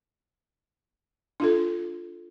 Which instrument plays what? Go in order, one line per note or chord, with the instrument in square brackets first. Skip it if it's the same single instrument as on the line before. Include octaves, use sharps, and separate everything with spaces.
[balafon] D4 F4 A4